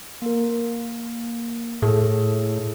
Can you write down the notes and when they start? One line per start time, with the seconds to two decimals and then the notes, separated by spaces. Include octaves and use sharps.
0.22 A#3 A#4
1.82 A2 G#4 A4